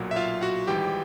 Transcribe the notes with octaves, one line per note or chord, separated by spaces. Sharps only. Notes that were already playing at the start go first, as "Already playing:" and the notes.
Already playing: B1 A#2 F#3
E5
F4 F5
F#4 F#5
G#1 G#2 E3 G3 G4 G5